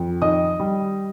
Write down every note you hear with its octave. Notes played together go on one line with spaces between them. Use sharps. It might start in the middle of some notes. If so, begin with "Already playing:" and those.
Already playing: F2
D#3 D#5 D#6
G3